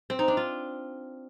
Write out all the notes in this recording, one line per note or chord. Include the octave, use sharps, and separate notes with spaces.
C4
D#4
D4
F4